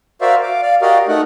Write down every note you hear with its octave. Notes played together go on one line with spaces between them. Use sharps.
F#4 A#4 C5 D5 E5 F5
F5 D6
D5 F5
F#4 G4 A#4 D5 D#5 F5
A3 D#4 A#4 F#5